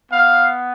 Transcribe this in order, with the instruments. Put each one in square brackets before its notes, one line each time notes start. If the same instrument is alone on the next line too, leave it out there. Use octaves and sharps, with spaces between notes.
[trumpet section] B3 F5